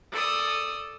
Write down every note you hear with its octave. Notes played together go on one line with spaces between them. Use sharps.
A4 D5 D#6